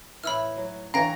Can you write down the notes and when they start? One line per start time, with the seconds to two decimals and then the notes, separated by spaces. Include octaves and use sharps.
0.24 A2 E3 B5 E6 F6
0.57 F#3
0.94 D3 E3 C#5 F5 G5 A#5 A#6